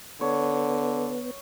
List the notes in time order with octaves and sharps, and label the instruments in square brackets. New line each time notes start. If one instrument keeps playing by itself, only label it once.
[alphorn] D3 [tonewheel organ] B3 [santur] C#5